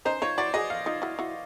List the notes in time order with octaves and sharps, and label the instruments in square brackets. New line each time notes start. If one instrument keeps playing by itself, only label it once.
[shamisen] C#4 D#4 [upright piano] C5
[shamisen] D#4 F4 [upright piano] C#5
[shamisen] E4 F#4 [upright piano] D5
[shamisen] F#4 G#4 [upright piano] D#5
[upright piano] F5
[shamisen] D#4 F4
E4 F#4
E4 F#4